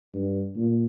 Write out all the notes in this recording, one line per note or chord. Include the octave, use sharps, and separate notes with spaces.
G2
A#2